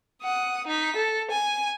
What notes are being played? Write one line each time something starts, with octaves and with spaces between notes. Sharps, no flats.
F#5 D#6
D#4 B6
A4
G#5